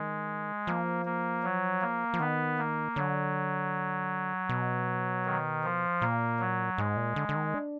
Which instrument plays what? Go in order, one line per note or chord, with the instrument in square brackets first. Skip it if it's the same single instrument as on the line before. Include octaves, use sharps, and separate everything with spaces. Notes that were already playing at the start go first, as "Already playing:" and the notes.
Already playing: [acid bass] D#3 [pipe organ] G#3
[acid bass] F3 [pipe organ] A#3
[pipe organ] A#3
F#3
A#3
[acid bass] F3
[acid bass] D#3 [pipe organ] B3
[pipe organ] A#3
[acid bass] D3 [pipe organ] F#3
[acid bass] B2
[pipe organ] D#3
F3
[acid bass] A#2 [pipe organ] A#3
[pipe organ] F#3
[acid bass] G#2 [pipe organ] G#3
[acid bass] A#2
D3
D3
D#3
D4